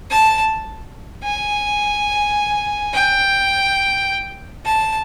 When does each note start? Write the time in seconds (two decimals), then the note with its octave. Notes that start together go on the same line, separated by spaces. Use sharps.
0.10 A5
1.23 G#5
2.94 G5
4.65 A5